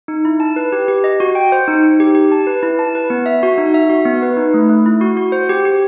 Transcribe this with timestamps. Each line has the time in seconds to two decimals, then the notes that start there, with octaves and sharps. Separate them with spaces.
0.08 D#4
0.25 E4
0.40 A5
0.56 B4
0.72 G4
0.88 G4
1.04 D#5
1.20 F#4
1.35 G5
1.52 C5
1.68 D#4
1.83 D#4
2.00 G4
2.15 G4
2.32 A5
2.47 B4
2.63 E4
2.79 A5
2.95 B4
3.10 B3
3.26 E5
3.43 F#4
3.58 D#4
3.74 E5
3.89 F#4
4.05 B3
4.22 B4
4.37 D#4
4.54 A3
4.69 A3
4.86 E4
5.01 F#4
5.17 F#4
5.32 C5
5.49 G4
5.65 G4